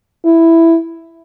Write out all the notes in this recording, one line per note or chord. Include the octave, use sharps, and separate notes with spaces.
E4